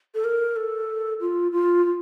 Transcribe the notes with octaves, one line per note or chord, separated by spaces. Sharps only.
A4
A#4
A4
F4
F4
F4